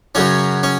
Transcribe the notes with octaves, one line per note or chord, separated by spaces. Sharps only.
F#2 C#3 F#3 C#4
C#4